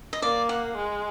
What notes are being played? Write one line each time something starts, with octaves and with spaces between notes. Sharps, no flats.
D#5
A#3 D5
F#5
G#3